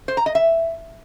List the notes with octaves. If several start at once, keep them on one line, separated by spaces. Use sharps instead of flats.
C5
A#5
D#5
E5